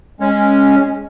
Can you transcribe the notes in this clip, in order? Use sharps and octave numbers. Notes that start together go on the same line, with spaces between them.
G#3 C#4